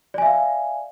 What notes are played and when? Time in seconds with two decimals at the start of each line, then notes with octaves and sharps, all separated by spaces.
0.14 D5
0.18 G#5
0.22 E5
0.26 F5